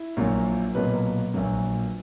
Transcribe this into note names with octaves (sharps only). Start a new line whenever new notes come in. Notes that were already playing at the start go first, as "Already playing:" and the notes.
Already playing: E4
A#1 A#2 F#3
B1 A#2 F#3 B4
A#1 A#2 F#3